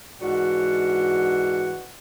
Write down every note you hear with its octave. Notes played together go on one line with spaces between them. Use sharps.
G#2 E3 D4 F#4 F#5